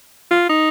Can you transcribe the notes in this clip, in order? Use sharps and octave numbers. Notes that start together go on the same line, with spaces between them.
F4
D#4